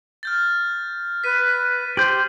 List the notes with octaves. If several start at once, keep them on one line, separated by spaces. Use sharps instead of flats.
F6 G6 A6
B4 B6 D#7
G4 C5 G6 F#7